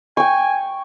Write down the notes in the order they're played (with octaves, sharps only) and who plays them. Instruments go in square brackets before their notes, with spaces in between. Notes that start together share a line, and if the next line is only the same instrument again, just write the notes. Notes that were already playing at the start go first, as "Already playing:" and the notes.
[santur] G5 C#6 [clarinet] G#5